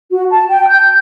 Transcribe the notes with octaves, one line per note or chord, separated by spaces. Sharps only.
F#4
A5
G5
G6